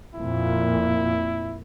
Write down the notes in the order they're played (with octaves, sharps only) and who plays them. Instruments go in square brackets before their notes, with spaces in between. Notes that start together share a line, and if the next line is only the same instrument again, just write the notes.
[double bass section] F2 A#2 [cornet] E4